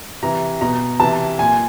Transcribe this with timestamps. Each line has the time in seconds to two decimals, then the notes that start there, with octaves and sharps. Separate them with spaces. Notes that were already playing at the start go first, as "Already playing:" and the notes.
0.22 C3 E3 A#5
0.61 B2 A#5
1.00 C3 E3 A5
1.39 A#2 G#5